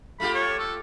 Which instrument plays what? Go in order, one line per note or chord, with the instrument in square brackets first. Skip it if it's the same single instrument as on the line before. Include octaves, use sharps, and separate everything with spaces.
[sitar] A3 F4 G4 [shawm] B5
[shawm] C#5
A4